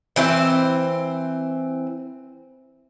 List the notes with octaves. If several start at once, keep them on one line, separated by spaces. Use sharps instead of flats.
E3 C4 C5